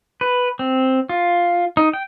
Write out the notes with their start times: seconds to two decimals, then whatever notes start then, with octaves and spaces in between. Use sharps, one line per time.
0.21 B4
0.59 C4
1.09 F4
1.77 D#4
1.93 G5